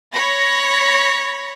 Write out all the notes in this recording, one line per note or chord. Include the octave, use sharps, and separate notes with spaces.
C#5 B5 A#6